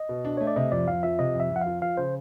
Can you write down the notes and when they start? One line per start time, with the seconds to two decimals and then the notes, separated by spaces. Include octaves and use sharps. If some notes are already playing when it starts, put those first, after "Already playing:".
Already playing: D#5
0.09 B2
0.25 D4
0.37 A3 C#5
0.47 D5
0.56 C3 D#5
0.72 F2 D5
0.88 F2 F5
1.03 F3 E5
1.19 C3 D#5
1.35 F2
1.40 E5
1.50 F2
1.56 F#5
1.62 F3 F5
1.81 F3 F5
1.97 C#3 C5